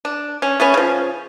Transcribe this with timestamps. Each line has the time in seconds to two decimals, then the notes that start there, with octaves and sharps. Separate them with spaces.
0.05 D4
0.42 C#4
0.60 A3 B3 C#4
0.74 C#3 F3